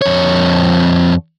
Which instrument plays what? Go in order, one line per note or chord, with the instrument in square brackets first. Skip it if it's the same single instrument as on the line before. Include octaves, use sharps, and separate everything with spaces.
[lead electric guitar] F2 C#5